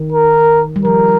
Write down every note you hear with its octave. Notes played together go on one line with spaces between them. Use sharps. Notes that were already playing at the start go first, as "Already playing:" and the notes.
Already playing: D#3
A#4
G3
F3 A#4